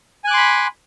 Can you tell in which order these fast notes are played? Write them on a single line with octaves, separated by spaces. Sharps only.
G#5 F#6 D6 C6 B5